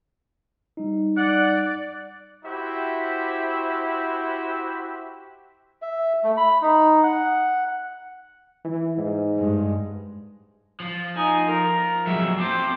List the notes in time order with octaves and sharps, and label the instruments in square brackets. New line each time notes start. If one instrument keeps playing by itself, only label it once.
[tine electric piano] G3 D#4
[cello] D5 [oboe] F#5
[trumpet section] E4 F#4 G4 C5 E5
[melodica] E5
A3
B5
D#4
F#5
[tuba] E3
G#2
[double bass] G2 G#3
[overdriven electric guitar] F3
[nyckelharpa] D#4 G#5
A#4
[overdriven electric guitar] F#3 G#3 [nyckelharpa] E5
[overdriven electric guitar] C4 A5 [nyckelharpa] C5 D6